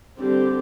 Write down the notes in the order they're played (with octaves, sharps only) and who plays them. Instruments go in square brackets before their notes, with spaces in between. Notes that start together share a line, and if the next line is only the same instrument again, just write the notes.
[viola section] D3 G3 C4 G4